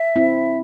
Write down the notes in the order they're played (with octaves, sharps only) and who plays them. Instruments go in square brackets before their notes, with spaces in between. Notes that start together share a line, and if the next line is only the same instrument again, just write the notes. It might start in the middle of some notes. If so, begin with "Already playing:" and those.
Already playing: [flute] E5
[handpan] C4 E4